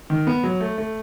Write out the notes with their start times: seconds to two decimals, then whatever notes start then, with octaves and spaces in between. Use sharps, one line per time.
0.10 D#3
0.27 B3
0.44 F#3
0.61 A3
0.78 A3